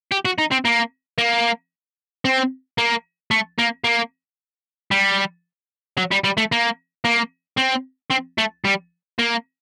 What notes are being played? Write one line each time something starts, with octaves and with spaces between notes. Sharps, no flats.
G4
F#4
D#4
C4
A#3
A#3
C4
A#3
A3
A#3
A#3
G3
F#3
G3
G3
A3
A#3
A#3
C4
C4
A3
G3
A#3